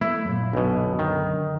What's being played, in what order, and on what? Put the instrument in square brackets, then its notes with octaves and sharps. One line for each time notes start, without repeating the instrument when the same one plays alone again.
[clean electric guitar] A3 A#3 [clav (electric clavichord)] E4
[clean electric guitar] F#2 A#2
[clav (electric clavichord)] B1 B2 [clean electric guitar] F#2 D3
[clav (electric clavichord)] D#3